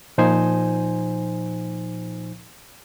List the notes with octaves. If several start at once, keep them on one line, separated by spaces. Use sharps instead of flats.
A#2 F3 D#4 C5 G#5